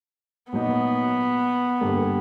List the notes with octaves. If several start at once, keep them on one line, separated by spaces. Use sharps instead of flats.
A#2 F#3 A#3 B3 D#4
G2 D3 G3 A#3